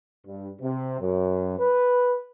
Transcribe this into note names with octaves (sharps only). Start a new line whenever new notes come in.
G2
C3
F#2
B4